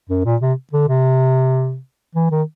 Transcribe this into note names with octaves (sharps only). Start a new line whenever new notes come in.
F#2
A#2
C3
D3
C3
E3
D#3